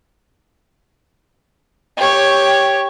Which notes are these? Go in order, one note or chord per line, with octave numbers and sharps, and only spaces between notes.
G4 C#5